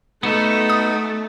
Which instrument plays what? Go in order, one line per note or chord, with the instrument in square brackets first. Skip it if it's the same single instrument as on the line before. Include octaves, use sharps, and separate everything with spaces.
[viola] A3 [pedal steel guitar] B3 F#4 A4 [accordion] D#4
[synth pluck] D#6